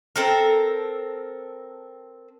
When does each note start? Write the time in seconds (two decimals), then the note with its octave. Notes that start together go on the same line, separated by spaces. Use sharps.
0.16 C4 A4 A#4